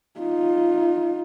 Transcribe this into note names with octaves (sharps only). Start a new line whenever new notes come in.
D#4 F4